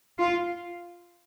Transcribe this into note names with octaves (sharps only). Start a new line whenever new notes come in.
F4